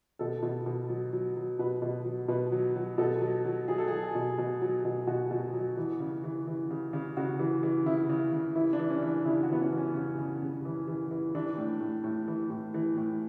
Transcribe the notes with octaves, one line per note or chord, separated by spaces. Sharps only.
B2 A4
B2
B2
F#3
F#3
F#3
B2 B4
B2
F#3
B2 B4
F#3
F#3
B2 A4
F#3
F#3
F#3 G#4
A4
F#3 G#4
B2
B2
F#3
B2
B2 F#4
B2
F#3
E3
C#3
E3
E3
C#3
C#3
C#3 F#4
E3
E3
C#3 E4
C#3
C#3
E3 E4
D4
E3
C#4
E3
D4
C#3 E4
F#4
E3 B3
C#4
E3
C#4
C#3 C#4
C#3
C#3
E3
E3
E3
E3 D4
A2
A2
A2
E3
A2
E3
A2